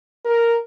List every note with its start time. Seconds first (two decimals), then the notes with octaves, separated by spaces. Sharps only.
0.25 A#4